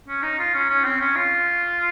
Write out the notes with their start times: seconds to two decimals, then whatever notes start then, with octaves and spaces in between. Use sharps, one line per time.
0.08 C#4
0.23 D#4
0.39 F4
0.54 C#4
0.70 C#4
0.84 C4
1.00 C#4
1.16 F4